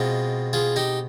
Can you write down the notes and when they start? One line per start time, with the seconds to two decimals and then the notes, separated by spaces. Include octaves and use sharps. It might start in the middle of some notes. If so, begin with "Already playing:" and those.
Already playing: B2 G#3 C4 F4
0.53 F4 G#4
0.76 D#4 G4